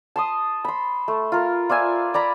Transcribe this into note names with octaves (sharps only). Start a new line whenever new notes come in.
A5 C6 D#6
B5 C6
A3
F4 A#4
F4 D5 E5 G#5
D5 A#5 B5